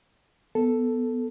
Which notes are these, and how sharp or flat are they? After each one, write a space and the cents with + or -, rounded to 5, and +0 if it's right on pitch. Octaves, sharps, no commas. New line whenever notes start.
B3 +0 A4 +0